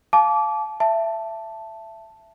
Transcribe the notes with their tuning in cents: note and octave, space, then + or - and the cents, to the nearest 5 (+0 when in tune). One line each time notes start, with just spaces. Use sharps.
F5 +0 A5 -30 D6 -20
E5 +20 A5 +0